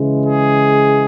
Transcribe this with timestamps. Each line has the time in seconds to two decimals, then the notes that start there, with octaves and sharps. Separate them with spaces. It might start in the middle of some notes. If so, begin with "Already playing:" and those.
Already playing: C#3 E3 G#3
0.26 G#4